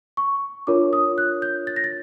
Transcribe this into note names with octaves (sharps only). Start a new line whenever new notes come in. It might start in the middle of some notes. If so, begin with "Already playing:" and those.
C#6
D4 F4 A#4 C#5 D6
D#6
F#6
G6
A6
A#6
A6